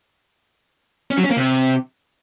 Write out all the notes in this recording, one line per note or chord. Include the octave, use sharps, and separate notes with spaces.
C#4
F#3
C#4
A#3
C3